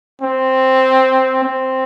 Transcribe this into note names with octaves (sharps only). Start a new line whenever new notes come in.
C4
C4